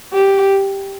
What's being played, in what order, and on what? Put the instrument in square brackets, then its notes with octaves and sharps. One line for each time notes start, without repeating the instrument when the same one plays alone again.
[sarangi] G4